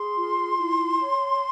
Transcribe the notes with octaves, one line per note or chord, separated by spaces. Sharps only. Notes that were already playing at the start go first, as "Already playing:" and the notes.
Already playing: G#4 C6
F4
E4
C#5